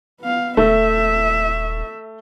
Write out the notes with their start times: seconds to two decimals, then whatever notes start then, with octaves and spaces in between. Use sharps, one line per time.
0.21 B3 F5
0.57 D#1 A3 E5